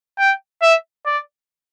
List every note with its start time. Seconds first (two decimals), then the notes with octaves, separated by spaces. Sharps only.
0.19 G5
0.62 E5
1.06 D5